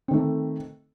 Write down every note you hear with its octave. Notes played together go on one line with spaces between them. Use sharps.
D#3 A3 C4